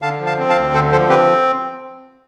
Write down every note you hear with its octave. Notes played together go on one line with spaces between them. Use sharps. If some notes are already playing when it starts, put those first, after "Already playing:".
D3 F5 A5
F3
F5 A5
C4
F5 A5
D2
D3 A4 C5
F3 A4 C5
C4 G4 B4